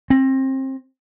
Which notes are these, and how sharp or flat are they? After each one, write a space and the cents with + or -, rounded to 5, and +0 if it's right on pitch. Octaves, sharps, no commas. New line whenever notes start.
C4 +25